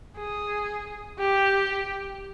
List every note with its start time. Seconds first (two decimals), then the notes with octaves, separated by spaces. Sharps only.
0.18 G#4
1.19 G4